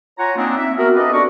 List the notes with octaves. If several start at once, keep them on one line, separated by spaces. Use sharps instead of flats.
F4 C#5 F#5 G#5 A#5
A#3 C4 D4 D#4
E5
B3 F#4 A#4
C4 D4 G4 A4 B4 D#5
D4 D#4 F#4 D5 A#5 C#6